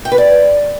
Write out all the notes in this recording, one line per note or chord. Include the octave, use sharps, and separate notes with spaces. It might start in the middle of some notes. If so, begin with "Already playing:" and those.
G5
B4
D5